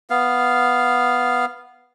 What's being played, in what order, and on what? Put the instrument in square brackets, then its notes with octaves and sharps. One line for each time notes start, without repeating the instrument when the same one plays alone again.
[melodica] B3 F5